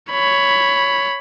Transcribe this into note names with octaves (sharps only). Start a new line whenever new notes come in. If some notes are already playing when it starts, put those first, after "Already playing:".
C#5 B5